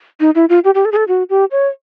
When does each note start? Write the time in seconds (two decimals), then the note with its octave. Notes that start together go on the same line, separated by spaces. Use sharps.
0.20 D#4
0.35 E4
0.49 F4
0.64 G4
0.75 G4
0.85 A4
0.92 G#4
0.96 A4
1.08 F#4
1.30 G4
1.51 C#5